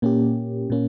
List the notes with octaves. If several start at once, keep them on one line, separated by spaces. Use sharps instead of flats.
A#2 A#3 C#4 G4
A#2 A#3 C#4